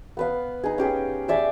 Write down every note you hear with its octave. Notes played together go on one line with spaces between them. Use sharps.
B3 B4 F5
D#4 G#4
C#4 G4 G#4
G#4 D5 E5 G5